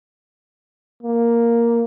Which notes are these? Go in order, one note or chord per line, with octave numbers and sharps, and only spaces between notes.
A#3